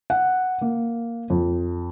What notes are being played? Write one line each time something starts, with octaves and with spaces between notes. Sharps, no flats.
F#5
A#3
F2